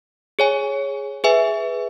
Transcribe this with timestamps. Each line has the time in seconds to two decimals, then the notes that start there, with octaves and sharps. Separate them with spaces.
0.39 G#4 C#5 G#5
1.24 G#4 B4 E5 G#5